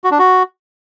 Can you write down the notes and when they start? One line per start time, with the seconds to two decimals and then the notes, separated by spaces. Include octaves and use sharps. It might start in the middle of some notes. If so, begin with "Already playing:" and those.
0.04 F#4
0.11 D4
0.19 F#4